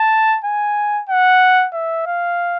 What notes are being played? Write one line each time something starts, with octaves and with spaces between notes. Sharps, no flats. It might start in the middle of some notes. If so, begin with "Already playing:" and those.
Already playing: A5
G#5
F#5
E5
F5